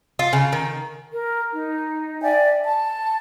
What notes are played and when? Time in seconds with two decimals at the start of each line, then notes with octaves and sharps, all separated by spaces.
0.19 F4
0.33 C#3
0.53 D#3
1.12 A#4
1.52 D#4
2.21 D5 E5 G5 G#5
2.64 A5